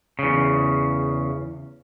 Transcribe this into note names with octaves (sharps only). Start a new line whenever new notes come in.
E2 C#3